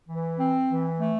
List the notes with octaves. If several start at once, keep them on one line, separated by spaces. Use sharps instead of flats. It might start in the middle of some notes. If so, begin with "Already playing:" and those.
E3
C4
E3
A3